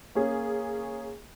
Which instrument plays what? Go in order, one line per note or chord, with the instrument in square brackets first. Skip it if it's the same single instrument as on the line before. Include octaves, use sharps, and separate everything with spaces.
[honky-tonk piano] A#3 C#4 G#4